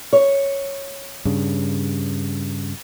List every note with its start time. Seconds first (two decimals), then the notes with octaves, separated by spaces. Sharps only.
0.13 C#5
1.25 G2 C#3